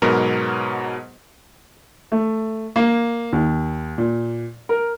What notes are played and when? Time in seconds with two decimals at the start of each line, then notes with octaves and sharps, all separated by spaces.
0.02 G#2 B2 F#3 B3 A#4
2.12 A3
2.76 A#3
3.33 D#2
3.98 A#2
4.69 A#4